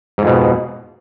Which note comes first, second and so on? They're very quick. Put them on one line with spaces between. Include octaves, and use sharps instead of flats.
G#2 F2 B2